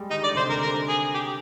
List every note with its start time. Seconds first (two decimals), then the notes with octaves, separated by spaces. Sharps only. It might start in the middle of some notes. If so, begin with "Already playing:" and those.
Already playing: G3 G#3
0.10 D#3 D#4
0.22 D3 D5
0.35 C3 C5
0.46 D3 A#4
0.62 A#4
0.88 G#4
1.14 G4